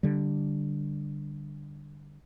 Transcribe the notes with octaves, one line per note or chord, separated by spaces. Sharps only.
D3 G3